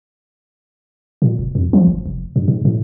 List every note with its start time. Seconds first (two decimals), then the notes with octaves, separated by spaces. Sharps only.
1.22 A#2
1.39 F1
1.55 F2
1.73 F3
1.87 G1
2.06 F1
2.36 G2
2.48 G#2
2.65 A2